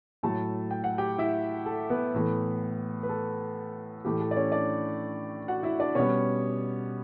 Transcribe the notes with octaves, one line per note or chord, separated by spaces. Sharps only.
A2 F#3 A3 A4 A5
G5
F#5
G4 G5
E4 E5
A4
B3 B4
A2 E3 A3
B4
A4
A2 E3 A3 G4
A4
D5
C#4 C#5
D4 D5
F#4 F#5
E4 E5
D4 D5
B2 G3 B3 C#4 C#5